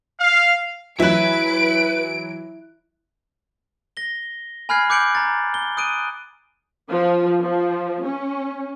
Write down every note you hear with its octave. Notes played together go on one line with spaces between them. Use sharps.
F5
E3 F#3 E4 B4 E5 F#6 D7
A#6 G7
G#5 B5 F6 F#6 G#6 C7
D6 F#6 G6 C#7 D7 F#7
A#5 A6
G7
D#6 F#6 D7 D#7
F3
F3
C#4